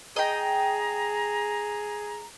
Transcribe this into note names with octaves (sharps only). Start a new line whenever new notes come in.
G#4 D#5 G5 A#5